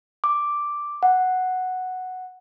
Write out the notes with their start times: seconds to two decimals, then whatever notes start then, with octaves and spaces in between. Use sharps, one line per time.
0.24 D6
1.03 F#5